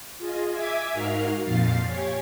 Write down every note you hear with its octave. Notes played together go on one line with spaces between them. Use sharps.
F4 G#4 D#5
E5 G#5 D6 G#6 B6
G#2 D#4 F#4 A#4 F5 F6
F2 A#2 F3 F5 A6 C7
G4 C#5 G#5